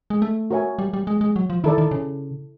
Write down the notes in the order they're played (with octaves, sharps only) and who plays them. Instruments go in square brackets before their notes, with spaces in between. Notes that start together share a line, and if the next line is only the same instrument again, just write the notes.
[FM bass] G#3
A3
[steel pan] F#4 A#4 C#5 E5 G#5
[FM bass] G3
G3
G#3
G#3
F#3
F3
[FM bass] D#3 [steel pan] E4 A4 D5
[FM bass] D#3
C#3